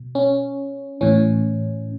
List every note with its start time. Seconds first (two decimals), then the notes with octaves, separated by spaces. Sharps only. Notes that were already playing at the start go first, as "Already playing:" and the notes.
Already playing: B2
0.15 C#4
1.01 A2 E3 C#4